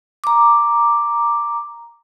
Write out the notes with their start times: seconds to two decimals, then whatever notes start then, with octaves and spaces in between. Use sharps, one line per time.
0.24 A#5 D6